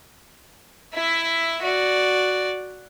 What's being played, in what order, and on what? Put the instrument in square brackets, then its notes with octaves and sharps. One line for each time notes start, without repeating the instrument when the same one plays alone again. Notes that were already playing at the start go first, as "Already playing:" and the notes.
[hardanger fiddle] E4 E5
F#4 D5